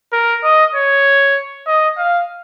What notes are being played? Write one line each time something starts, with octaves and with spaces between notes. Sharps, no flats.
A#4
D#5
C#5
D#5
F5